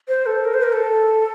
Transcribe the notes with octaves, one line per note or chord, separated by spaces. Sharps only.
C5
A4
A#4
C5
A#4
A4